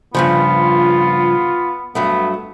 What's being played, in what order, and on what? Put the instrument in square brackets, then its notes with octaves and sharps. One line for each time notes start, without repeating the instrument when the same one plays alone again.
[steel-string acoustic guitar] G2 C#3 F3 [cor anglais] B3 [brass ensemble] F4
[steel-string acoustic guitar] G2 F#3 A3 [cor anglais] B3